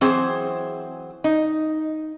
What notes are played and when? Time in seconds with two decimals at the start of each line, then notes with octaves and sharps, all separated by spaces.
0.01 E3 F#3 C4 G#4 C5
1.24 D#4